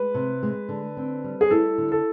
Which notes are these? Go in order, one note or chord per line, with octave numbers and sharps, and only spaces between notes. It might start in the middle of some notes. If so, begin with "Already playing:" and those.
Already playing: G#3 B4
C3
G#3
D3
C4
G3
G#4
E4 A4
D3
A4